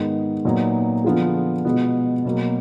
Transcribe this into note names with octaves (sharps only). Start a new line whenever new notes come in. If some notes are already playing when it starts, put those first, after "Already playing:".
Already playing: G#2 D#3 G#3 B3
A#2 F#3 B3 D#4
D3 F3 B3 F4 G#4
B2 G#3 B3 F4
B2 F#3 A#3